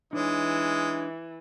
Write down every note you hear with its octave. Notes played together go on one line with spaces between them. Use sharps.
E3 G#3 D4 D#4 C#5